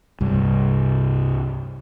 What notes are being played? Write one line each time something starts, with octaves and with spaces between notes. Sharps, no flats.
C2 G2